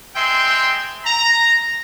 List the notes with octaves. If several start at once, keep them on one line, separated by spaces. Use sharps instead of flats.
G#3 C4 E5 G5 C6
A#5